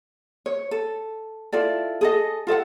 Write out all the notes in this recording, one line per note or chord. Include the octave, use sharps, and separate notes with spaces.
C#5
A4
E4 F4 A4 D5
G#4 A4 D#5
F4 A4 D#5 F#5